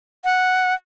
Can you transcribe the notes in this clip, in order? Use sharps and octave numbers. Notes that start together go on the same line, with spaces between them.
F#5